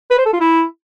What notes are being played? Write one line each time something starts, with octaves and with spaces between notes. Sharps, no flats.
B4
C5
A4
F4
E4